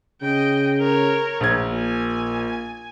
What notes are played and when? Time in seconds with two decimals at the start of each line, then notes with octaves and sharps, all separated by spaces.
0.22 C#3 D#5 G5
0.79 A#4 C#5
1.40 A#1 G#6
1.70 A#2 G#5